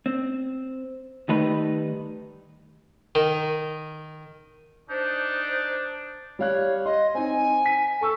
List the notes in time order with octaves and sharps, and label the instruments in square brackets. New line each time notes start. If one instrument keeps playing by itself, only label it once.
[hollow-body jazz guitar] C4
D#3 G3 A3 D#4 B4
[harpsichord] D#3
[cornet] D4 [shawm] D#4 [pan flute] C5
[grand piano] G3 F5 F#6 [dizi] C#5
[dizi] D#5 [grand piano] C6
[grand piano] C4 D#4 [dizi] G#5
[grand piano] B6
[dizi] A4 [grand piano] A5 C#6 E6